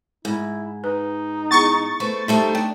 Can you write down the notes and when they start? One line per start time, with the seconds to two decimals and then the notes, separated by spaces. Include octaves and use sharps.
0.25 G#2 E4
0.84 D#4 B4
1.51 B3 E4 G#4 C#6 A6
2.00 A3 B4 C5
2.28 G3 A3 D#4 C5 E5 A5
2.55 D4 G5